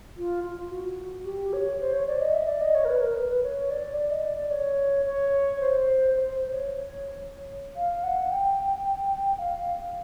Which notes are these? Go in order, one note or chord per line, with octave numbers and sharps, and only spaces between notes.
F4
F4
F#4
G4
C#5
C5
C#5
D5
D#5
E5
D5
D#5
C#5
A#4
B4
A#4
B4
B4
C#5
D5
D5
D#5
D5
D5
C#5
C#5
C5
C5
C5
C#5
F5
F#5
G5
F5